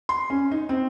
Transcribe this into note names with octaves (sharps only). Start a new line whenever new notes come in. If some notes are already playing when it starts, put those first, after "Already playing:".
C6
C#4
D#4
C4